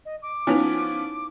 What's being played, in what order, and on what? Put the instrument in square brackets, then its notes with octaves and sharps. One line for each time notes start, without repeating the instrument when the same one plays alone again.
[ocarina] D#5
D6
[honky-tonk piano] F3 B3 C#4 [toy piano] D#4 E4 G#5